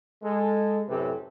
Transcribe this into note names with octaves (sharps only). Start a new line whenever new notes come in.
G#3 A4
F#2 A2 C3 G4 A4 B4